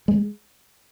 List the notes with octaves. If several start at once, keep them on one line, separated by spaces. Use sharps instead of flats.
G#3